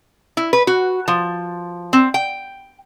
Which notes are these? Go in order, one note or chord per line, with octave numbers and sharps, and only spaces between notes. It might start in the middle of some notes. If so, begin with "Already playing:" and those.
E4
B4
F#4
F3
C4
G5